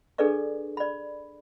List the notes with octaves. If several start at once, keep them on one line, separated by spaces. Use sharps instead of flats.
D4 G#4 A4 B4 D5 C#6
D5 B5